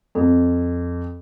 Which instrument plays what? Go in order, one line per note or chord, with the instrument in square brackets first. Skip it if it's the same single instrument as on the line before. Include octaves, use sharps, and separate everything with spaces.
[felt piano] F2